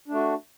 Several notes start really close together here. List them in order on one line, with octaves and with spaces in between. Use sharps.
D4 A3 F#4